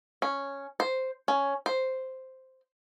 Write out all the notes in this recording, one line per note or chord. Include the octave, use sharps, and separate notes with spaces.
C#4
C5
C#4
C5